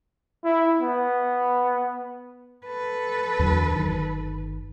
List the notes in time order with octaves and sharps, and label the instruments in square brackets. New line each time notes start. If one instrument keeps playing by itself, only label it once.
[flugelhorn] E4
B3
[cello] A4 B4
[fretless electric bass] E2 D3 F#3
G1 D#3